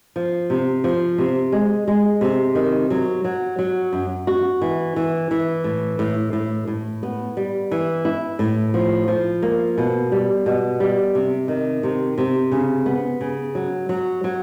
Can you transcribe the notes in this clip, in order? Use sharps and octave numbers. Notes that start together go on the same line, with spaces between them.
F3
C3
F3
C3
G#3
G#3
C3
D#3
F#3
F#3
F#3
F#2
F#4
E3
E3
E3
A2
A2
A2
A2
B3
G3
E3
E4
A2
F3
F3
A#3
B2
G3
B2
G3
C3
D#3
C3
C3
C#3
B3
C#3
F#3
F#3
F#3